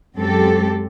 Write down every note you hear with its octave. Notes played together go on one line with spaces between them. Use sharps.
F#2 F#3 G#3 C4 G4 A4